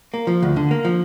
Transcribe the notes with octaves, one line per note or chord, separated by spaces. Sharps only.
A#3
F3
D2
D3
A#3
F3